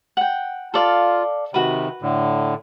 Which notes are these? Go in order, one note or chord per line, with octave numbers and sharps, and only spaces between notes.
F#5 G5
F4 A4 D5 F5
C3 D#3 F#4 B4
A2 D3